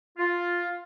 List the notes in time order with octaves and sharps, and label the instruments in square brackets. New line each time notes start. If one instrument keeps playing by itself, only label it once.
[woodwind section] F4